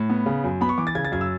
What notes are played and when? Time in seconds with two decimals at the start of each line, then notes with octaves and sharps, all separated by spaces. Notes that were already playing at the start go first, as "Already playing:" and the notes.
Already playing: A2
0.10 B3
0.26 C#3
0.44 F#2
0.61 B3 B5
0.69 C#6
0.78 E3 D6
0.87 A6
0.95 C#3 G#6
1.05 A6
1.12 F#2 G#6
1.21 E6